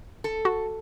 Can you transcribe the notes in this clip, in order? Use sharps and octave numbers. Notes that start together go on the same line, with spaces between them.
A4
F#4